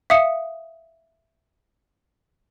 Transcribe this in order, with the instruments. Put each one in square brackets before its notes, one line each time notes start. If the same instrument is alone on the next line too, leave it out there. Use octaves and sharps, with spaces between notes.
[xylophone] E5 F5 D#6 C#7